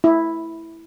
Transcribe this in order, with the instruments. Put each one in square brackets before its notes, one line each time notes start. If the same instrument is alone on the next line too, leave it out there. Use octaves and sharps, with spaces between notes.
[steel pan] E4